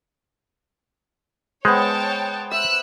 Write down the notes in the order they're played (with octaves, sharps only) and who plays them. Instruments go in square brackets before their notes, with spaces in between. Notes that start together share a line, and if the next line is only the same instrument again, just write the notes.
[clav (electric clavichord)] G#3 [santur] B3 C5 [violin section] C#5 G5 A5
[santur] E5 [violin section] E6 F#6